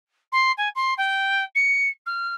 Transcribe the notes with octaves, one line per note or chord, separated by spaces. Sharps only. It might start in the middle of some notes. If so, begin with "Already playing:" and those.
C6
G#5
C6
G5
C#7
F6